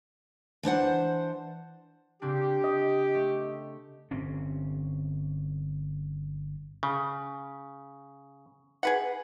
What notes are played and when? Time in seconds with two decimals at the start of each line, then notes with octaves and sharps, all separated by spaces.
0.63 E3 D4 C5 F#5
2.22 C#3 C4 D4 G4
2.64 D#5
3.15 A3
4.11 G1 C4 C#4
6.83 C#3
8.83 G#4 B4 F#5